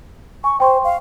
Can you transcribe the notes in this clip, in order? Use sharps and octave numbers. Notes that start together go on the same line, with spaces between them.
G#5 C#6
C5 G5 C6 C#6
F5